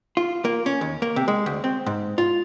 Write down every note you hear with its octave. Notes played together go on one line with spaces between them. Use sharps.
F4
A#3
C#4
D#2
A#3
C3
G#3
D2
C4
G#2
F4